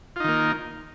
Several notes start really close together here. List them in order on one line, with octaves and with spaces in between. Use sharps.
F4 D#4 D#3 A#3